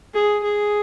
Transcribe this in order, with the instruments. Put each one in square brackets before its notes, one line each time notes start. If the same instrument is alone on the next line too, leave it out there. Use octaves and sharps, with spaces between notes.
[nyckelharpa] G#4
G#4